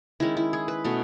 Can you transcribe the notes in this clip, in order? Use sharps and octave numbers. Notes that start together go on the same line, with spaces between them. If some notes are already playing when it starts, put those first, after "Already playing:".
D#3 G#3 C#4 E4
E4
G#4
B4
B2 A3 C#4